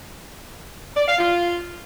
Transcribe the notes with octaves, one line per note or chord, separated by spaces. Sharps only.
D5
F5
F4